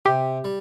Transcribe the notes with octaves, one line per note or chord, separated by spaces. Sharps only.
C3 G4
G3